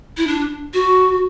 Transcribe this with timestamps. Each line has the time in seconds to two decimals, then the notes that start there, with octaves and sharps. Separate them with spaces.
0.17 E4
0.27 D4
0.74 F#4